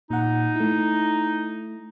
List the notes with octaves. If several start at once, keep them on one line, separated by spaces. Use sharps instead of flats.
A#2 D#4 F#5
A3 E4